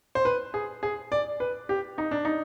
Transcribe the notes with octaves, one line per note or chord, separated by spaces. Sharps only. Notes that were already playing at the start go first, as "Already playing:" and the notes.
C5
B4
G#4
G#4
D5
B4
G4
D#4
D4
D#4